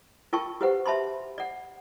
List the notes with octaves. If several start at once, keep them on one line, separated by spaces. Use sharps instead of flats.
F4 A#4 G5 A5 C#6
F#4 G4 B4 C5 F#5
E5 A5 B5 C6
D5 F#5